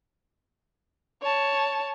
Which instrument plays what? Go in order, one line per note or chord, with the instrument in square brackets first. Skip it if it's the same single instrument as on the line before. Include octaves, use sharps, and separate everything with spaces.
[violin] C#5 A5